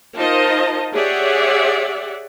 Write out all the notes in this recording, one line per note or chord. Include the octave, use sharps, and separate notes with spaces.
D#4 F4 A#4 C5 D#5 A5
G4 G#4 C#5 D5 E5 F#5